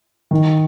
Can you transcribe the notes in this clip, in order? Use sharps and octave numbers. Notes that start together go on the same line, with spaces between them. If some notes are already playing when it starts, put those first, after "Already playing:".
D#3